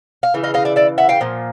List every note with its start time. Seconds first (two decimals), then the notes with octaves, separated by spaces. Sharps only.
0.23 F5
0.34 C#3 E3
0.43 D#5 F5
0.54 D#5 F5
0.65 D5 E5
0.76 D5 E5
0.98 E5 F#5
1.09 F5 G5
1.20 A#2 F3